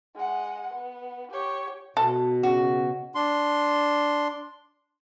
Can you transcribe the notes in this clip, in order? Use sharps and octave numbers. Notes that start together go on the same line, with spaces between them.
G#3 F#5
B3
G4 C#5
B2 A4
C#3 F#4
D4 C6